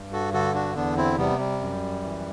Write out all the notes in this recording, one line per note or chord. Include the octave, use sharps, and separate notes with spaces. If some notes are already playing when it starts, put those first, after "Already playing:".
Already playing: G2
F#4 A4
D3 F#4 A4
D4 F#4
E2 B3 D4
C4 E4
C3 G3 B3
G3
F#2
E3